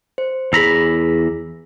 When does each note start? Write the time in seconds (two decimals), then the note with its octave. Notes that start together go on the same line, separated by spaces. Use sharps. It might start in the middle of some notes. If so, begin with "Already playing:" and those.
0.18 C5
0.53 E2 G#4 A#5 B5 E6